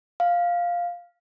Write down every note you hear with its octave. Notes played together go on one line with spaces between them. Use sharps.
F5